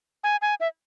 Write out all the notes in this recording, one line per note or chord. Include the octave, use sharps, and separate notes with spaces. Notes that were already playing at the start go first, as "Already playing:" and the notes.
G#5
G#5
E5